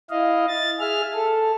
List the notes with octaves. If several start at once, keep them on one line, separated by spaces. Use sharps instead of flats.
E4 D#5 F5
A6
G#4 E5 F6
A4